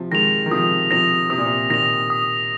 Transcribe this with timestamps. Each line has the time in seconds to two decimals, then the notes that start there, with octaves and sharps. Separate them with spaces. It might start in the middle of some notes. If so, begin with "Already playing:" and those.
Already playing: C3 F3
0.11 D#3 G#3 A#6 F7
0.46 D#3
0.51 C3 F3 D#6
0.91 C3 F3 A#6 F7
1.30 C3 D#6
1.38 A#2
1.45 C3
1.69 A#2 D#3 A#6 F7
2.10 D#6